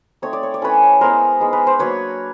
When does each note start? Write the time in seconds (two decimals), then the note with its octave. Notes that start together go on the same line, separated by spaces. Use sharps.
0.22 A3 C4 D#4 C#5
0.33 D5
0.43 C#5
0.54 D5
0.62 A3 C#4 E4 B4 C#5
1.01 G#3 B3 E4 A#4 C5
1.40 G#3 B3 D#4
1.53 B4
1.67 C5
1.79 F#3 A#3 D4 B4 C#5